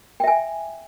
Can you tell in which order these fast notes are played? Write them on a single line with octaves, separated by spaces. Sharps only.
G5 E5 G#5